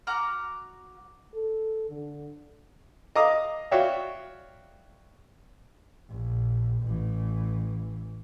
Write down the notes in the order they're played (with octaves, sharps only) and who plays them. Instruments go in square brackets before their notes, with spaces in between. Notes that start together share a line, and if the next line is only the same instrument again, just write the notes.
[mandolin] F#4 A#5 D6 F6
[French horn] A4
D3
[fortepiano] D#5 F5 A#5 D6 D#6
F#4 C#5 D5 E5 F5 G5
[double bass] A#1
A1 E3